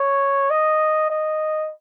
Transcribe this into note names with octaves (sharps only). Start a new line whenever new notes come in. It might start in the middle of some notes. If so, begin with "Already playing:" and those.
Already playing: C#5
D#5
D#5